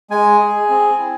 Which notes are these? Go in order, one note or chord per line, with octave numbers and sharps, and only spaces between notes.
G#3 G#5
G#4
C4
E4